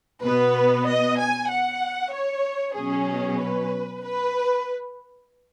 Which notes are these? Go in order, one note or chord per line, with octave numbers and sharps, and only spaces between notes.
B2 B3 B4
D#5
G#5
F#5
C#5
B2 F#3 C#4 G#4
B4
B4